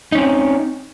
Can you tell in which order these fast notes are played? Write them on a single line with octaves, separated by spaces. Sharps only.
D#4 C#4 C4